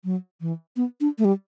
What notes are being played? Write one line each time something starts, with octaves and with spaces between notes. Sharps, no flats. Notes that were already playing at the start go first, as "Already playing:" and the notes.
F#3
E3
B3
D4
A3
G3